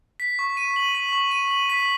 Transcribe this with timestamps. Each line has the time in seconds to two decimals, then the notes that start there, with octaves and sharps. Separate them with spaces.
0.20 B6
0.39 C#6
0.57 D#7
0.76 F#7
0.95 B6
1.13 C#6
1.31 D#7
1.51 F#7
1.69 B6